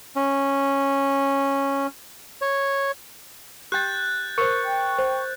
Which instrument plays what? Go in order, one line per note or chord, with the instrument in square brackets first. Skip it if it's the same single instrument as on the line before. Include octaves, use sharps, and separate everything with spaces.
[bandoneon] C#4
C#5
[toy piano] G4 G5 [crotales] F#6 G6 A6
[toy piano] A#4 C5 [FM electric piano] C#6
[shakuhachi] G5
[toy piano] C5